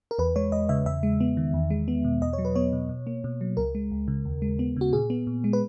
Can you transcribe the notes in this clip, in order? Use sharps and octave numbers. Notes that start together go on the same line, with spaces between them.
A#4
E2 B4
G#3 C#5
E2 D#5
C#3 E5
E2 E5
G#3
B3
D#3
E2
G#3
B3
B2
E2 D#5
C#5
F#3
B4
B3 C#5
B2
B2
A#3
B2
F#3
C#2 A#4
G#3
C#2
C#3
D#2
G#3
B3
C#3 F#4
A#2 G#4
B3
A#2
G#3
B4